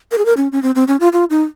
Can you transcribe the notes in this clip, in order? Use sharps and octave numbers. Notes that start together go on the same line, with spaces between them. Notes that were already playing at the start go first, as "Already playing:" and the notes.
A#4
G#4
A#4
C#4
C#4
C4
C4
C#4
F4
F4
D#4